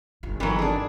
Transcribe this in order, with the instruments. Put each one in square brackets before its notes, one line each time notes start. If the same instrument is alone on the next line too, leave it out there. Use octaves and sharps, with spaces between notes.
[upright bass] G1 F4
[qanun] D#3 A#4 B4 [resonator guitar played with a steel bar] E3 F#3
[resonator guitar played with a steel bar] D4 G#4 [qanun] A4